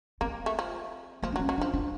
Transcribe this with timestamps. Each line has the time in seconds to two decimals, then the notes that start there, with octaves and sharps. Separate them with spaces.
0.21 A#3 C4
0.46 A3
0.59 F3
1.22 F3 A#3
1.32 D4
1.36 F#3
1.39 C#4
1.49 F#3
1.58 F3 D4
1.74 D4